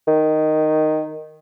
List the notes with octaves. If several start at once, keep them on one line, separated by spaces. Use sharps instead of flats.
D#3